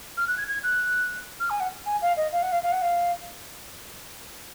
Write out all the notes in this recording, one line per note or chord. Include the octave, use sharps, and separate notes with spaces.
F6
F#6
G#6
G#6
F#6
F6
G#5
F#5
G#5
F5
D#5
F5
F#5
F5
F5
F#5
F5